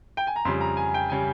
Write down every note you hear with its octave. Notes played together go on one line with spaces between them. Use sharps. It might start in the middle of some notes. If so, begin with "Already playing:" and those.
G5
G#5
A#5
F2 C#3 G3 C6
A#5
G#5
G5
C#3 G3 G#5